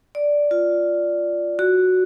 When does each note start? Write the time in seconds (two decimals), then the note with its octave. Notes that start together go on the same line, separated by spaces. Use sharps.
0.15 D5
0.51 F4
1.59 F#4